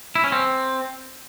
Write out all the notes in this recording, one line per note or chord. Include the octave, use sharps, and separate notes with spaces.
E4
C#4
C4